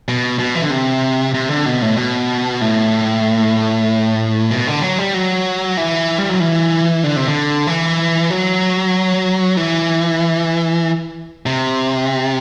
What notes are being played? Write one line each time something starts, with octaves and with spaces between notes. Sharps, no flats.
B2
B2
E3
D3
C3
C3
D3
B2
A2
B2
A2
B2
D3
F#3
G3
F#3
E3
G3
F#3
E3
D3
C3
D3
E3
F#3
E3
C3